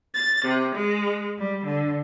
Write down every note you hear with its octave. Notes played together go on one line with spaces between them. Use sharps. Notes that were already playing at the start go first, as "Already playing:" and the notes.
A6
C3
G#3
G3
D3